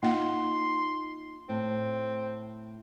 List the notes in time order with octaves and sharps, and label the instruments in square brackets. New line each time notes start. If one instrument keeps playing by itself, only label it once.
[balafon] A#3 F#5 [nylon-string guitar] D#4 F4 [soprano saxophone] C6
[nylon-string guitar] A2 [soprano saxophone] C4